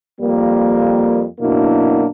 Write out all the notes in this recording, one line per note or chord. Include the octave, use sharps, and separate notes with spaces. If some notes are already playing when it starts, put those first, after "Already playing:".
F2 G3 A#3
F#2 B2 A#3 D4 E4